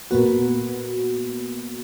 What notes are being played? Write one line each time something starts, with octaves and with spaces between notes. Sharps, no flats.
A#2 A#3 B3 F#4